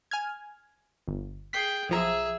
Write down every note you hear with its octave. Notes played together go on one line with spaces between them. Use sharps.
G#5 F6 G#6
G1
G#4 G5 B6 C7
B1 F3 G#4 E5 A#5